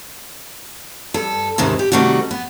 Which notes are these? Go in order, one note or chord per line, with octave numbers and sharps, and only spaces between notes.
G2 A4
D#2 G#2 C3 D#3 E3
G4
C3 D#3 G3 A3 F#4
B3